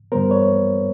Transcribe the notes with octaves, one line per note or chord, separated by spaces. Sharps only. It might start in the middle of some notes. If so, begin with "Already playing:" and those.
G2 D3 G3 B3 A#4 C5
B4 C#5